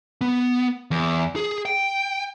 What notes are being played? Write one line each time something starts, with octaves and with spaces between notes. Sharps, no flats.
B3
E2
G#4
G5